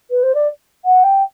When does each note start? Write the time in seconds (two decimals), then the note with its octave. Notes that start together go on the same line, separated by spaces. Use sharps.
0.10 B4
0.23 C5
0.34 D5
0.85 F#5
1.03 G5